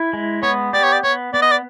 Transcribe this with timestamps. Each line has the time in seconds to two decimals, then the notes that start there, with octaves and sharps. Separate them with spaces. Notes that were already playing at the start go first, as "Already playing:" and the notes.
Already playing: E4
0.13 G#3
0.43 B3 C#5
0.73 G4 D5
0.84 C#5
0.93 D5
1.04 B3 C#5
1.34 B3 D5
1.42 D#5
1.51 D5